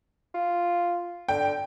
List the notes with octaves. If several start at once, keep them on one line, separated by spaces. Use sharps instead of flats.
F4
D3 G5